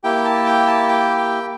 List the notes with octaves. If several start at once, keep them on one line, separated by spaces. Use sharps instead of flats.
A#3 E4 G4 G5
A5
G5
A5
G5
G5